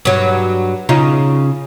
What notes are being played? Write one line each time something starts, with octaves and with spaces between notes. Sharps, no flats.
G2 F#3
C#3 D#4 F4